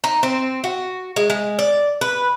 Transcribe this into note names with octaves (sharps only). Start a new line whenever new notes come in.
D#4
C4
F#4
G#3
G#3
D5
B4